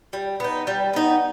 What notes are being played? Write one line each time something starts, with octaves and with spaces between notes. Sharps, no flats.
G3
B3 D#4
G3
B3 D#4